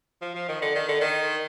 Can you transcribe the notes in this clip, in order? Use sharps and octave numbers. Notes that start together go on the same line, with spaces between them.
F3
F3
D#3
D3
D#3
D3
D#3